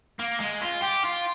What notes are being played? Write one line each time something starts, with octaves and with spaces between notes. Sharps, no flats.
A#3
G#3
F4
G4
F4